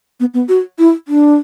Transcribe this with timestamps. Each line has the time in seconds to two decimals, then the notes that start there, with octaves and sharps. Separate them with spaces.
0.20 B3
0.34 B3
0.49 F#4
0.79 E4
1.08 D4